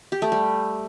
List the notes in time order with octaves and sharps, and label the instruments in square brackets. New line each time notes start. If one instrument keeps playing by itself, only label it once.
[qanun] G4
A3
G3